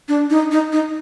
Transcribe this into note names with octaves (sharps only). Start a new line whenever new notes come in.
D4
D#4
D#4
D#4